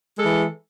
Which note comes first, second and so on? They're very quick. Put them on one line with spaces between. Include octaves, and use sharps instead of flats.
G#3 A4 E3